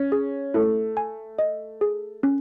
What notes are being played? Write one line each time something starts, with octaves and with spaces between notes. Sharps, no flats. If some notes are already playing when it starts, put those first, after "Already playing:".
Already playing: C#4
G#4
A3 E4
G#5
D#5
G#4
C#4